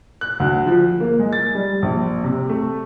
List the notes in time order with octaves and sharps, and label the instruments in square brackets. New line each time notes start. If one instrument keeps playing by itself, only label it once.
[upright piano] F#6
D2
F3
A#3
G#3
A6
G3
A#1
C3
A3